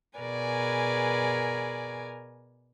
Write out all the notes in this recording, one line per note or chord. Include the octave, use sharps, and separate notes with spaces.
B2 G#4 A#4 B4 D5 G#5